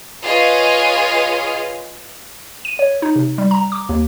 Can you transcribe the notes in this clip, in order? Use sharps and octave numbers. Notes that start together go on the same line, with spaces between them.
F4 G#4 B4 C#5 D#5 F5
D#7
C#5
D#4
C3
G3
A#5
D6
D#2